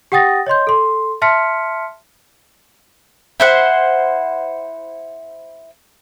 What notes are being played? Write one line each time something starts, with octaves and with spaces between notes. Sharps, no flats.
G4 F#5 G5 D#6 A6 A#6
C#5 D#5 C6 G6
A4 C6
E5 A5 C6 F6 B6 C#7
E4 C5 F#5